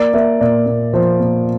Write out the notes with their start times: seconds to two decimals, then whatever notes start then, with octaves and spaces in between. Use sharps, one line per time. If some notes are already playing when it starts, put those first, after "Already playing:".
Already playing: A#3 D5
0.14 A#3 E5
0.41 A#2 D5
0.66 A#2
0.93 F3 C5
1.20 A#2